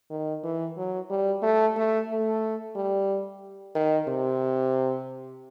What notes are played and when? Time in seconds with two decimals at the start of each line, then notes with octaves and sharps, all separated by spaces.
0.10 D#3
0.43 E3
0.77 F#3
1.10 G3
1.43 A3
1.76 A3
2.09 A3
2.76 G3
3.75 D#3
4.08 C3